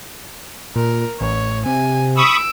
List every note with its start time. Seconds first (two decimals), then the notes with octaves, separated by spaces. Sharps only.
0.76 A#2 A#4
1.21 A1 C#5
1.66 C3 G#5
2.17 B5 C#6 D#6 E6 D7